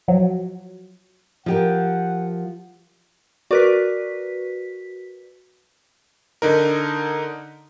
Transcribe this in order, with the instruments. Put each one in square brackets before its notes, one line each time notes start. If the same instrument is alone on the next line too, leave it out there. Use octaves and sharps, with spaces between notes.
[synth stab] F3 F#3
[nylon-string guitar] F3 G4 A#4 [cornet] F#5
[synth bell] F#4 B4 B6 [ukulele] A#4 D5
[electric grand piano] D3 D#4 A#4